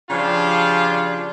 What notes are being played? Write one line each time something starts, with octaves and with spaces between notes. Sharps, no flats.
C#3 F3 D4 F4 G4